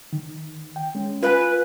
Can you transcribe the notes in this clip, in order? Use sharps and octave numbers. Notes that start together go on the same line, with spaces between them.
D#3
G5
G#3 C#4
F4 B4 F5 G#5